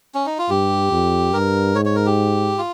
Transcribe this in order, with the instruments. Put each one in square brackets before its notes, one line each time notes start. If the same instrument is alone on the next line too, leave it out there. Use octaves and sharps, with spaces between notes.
[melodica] C#4
D#4
F4
[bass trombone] G2 [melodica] G4
[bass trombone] F2
[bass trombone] G2 [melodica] A#4
[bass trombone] G#2 [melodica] C#5
[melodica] C#5
A#4
G4
F4